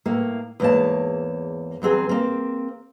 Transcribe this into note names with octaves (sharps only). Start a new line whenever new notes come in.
A2 A#3
E2 G#2 A#3 C#5 A5
E2 F#3 C4 G#4
A#3 C4